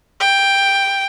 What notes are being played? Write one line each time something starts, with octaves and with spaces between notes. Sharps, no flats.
G5